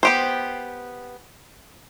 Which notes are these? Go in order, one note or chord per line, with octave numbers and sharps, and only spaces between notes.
B3 G4 C5